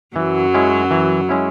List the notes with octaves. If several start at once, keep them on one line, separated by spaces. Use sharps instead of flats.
F#2 E3 F#3
G#3 C#4 E4
E3
G#3 C#4 E4